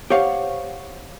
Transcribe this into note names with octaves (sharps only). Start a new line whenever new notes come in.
G4 C5 C#5 F5 F#5